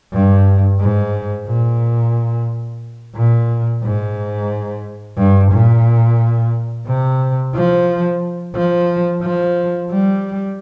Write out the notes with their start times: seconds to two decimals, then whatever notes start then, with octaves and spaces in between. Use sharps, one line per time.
0.13 G2
0.80 G#2
1.47 A#2
3.15 A#2
3.83 G#2
5.17 G2
5.52 A#2
6.87 C3
7.55 F3
8.55 F3
9.22 F3
9.91 G3